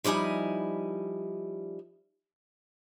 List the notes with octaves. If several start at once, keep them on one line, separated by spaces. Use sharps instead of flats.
F3 G3 D#4 E4 G#5